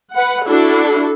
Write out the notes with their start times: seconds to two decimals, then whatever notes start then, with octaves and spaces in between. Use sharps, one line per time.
0.12 B4 F#5
0.45 D4 E4 F#4 A4